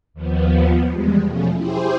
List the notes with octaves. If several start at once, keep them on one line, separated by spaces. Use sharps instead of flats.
D#2 F3 B3
E2 G3 G#3
B2 F3 A3 C#4
E4 G4 G#4 C5